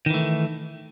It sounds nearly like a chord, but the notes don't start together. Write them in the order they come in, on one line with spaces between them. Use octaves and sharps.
D#3 E3 A3